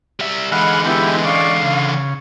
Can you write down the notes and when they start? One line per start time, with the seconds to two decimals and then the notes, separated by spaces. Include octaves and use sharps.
0.20 G3 E5
0.52 D3 E3 G#3 F5 F#5 B5
0.86 B3 E4 G4
1.25 C#4 D5 F5
1.63 C#3